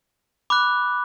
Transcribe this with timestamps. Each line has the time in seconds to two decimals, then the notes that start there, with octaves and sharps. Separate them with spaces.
0.50 B5 D6 F#6